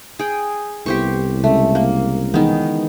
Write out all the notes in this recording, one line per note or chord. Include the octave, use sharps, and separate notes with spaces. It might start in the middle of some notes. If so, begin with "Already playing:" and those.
G#4 G5
C2 B3 E4 G4 A4 C5 C#6
C#3 G#3 A3 C#4
A#3
D#3 E3 G#3 B3 G#4